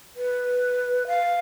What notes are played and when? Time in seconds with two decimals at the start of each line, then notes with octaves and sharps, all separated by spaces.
0.16 B4
1.08 F5